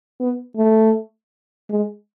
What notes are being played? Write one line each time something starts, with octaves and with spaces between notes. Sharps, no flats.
B3
A3
G#3